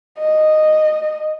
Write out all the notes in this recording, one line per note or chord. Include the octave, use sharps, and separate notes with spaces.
D#5